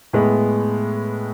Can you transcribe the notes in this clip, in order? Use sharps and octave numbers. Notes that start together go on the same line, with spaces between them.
A2 G#3 B3